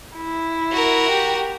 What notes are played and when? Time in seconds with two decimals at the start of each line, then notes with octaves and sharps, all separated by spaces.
0.17 E4
0.72 F#4 A#4
1.11 G4